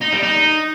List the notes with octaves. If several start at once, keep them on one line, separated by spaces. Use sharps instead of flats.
D#4
G3
D#4